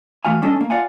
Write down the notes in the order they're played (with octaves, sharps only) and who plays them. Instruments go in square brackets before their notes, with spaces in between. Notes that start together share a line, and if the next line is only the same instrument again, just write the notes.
[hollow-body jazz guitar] E3 A3 F#4 F5 G#5
G3 C#4 D4 A4 A#4 D#5
A#3 C#4
F4 D5 F5 F#5 G#5